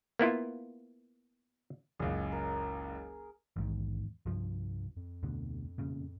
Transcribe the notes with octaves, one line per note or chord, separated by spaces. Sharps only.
A#3 B3 E4 F4
F#1 C#2 G#4
A#4
A#1 E2 G#2 D#3
C2 G2 F3
F2
D2 B2 D3
E1 A#2 C#3